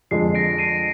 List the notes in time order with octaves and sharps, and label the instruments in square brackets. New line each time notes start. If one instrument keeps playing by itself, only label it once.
[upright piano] F2 D3 G#3 [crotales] C7
[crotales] A#6 D7
C7 D#7